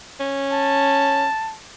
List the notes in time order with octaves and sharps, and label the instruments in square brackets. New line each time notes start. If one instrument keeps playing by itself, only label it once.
[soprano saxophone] C#4
[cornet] A5